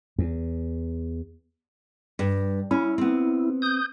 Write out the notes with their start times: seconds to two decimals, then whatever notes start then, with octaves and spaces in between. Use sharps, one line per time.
0.18 E2
2.19 G2
2.71 C#4 E4
2.98 B3 C4
3.62 D#6 G6